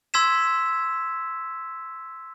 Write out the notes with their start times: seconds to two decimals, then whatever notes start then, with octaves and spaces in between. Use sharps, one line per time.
0.14 C6 E6 G#6 B6 E7